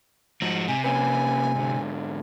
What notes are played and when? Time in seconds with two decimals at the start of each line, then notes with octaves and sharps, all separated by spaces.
0.42 G#2 F3 F#4
0.68 C3 G#5
0.84 A#3 C#4 B4 G#5
1.55 G#2 D3